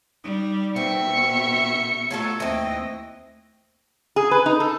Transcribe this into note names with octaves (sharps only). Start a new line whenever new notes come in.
G3 D#4
B2 C4 E5 C#7
B3 C#6
F#3 A3 F4 A4 C#6
D#2 E3 C4 D#5
G#4
B4
D#4
A4